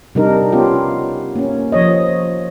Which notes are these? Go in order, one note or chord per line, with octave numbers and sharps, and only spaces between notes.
C3 G3 D4 D#4 A#4
B3 C#4 F4 G4
A#3 C#4
F3 C#5 D#5